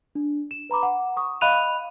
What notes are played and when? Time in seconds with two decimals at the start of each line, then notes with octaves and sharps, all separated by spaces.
0.15 D4
0.51 E7
0.70 B4 A#5 B5 D6
0.83 F#5
1.17 C#6 D#6
1.41 D#5 F5 B5 F#6 D#7 F7